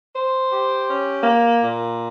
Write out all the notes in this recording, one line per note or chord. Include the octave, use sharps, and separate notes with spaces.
C5
G4
C#4
A#3
A#2